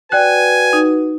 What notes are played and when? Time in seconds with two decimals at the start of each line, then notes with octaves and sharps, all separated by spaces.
0.12 F#4 B4 D5 G5 G#5 F#6
0.73 D#4